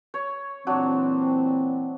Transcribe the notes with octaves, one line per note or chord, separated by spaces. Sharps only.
C#5
A#2 E3 F#3 C4 D4